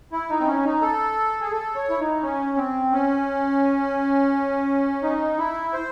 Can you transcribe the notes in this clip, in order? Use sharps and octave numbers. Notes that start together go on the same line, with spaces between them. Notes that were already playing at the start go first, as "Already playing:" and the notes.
E4
D#4
C4
C#4
D#4
A4
G#4
A4
C#5
E4
D#4
C#4
C4
C#4
D#4
E4
C5